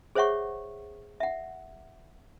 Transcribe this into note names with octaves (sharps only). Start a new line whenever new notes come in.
G#4 C5 C#5 E5 F#5 C#6
E5 F#5